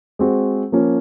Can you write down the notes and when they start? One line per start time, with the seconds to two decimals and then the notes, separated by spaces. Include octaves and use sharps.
0.19 G#3 C4 F#4
0.72 F3 A#3 C#4